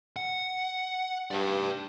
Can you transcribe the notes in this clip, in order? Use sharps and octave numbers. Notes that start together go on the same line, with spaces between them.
F#5
G2 B4 D5